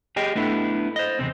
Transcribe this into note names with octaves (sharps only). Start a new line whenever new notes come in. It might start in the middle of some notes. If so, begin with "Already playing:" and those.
G4 G#4 D#5 G5
A3 B3 D4 E4 A4
C5 D#5
E2 G#2 C3 C4